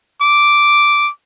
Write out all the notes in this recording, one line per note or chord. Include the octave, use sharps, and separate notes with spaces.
D6